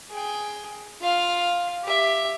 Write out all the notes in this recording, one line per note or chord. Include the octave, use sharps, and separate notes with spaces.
G#4 G5
F4 F5
G4 E5